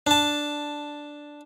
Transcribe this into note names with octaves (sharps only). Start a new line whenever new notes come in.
D4 A5